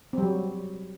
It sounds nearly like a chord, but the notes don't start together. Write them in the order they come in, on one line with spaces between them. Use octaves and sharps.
C4 G3 F#3